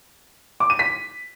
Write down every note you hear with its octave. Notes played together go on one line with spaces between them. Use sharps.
D6
D#7
B6